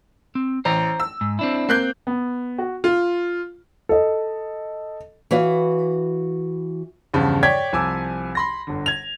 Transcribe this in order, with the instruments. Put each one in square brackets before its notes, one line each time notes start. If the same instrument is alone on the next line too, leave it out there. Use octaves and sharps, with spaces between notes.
[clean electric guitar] C4
[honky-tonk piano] A1 [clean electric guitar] C5 A#5
[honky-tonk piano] E6
[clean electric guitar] G#2
C4 D4 E4
[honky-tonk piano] A#3 F#6 G6 [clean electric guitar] C4
[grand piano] B3
F#4
F4
[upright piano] A4 D#5
[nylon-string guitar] E3 F#4 B4 C#5 F5
[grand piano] E2 G2 C#3 F3
C#5 D5 G5 G#6 B6
C2 F3 G#5 D6 E6
B5 C6 A#6
G1 D3
G#6 F7